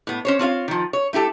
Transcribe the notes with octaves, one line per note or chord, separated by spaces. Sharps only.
A2 B3
C#4 C5 C#5
C4 F4 C#5 F5
D#3 F3
C#5
A3 E4 G4 A4